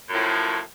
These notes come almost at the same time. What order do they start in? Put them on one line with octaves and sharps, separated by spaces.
F#2 A2 F3